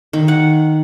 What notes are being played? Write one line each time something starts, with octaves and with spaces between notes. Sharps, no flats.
D#3
F#5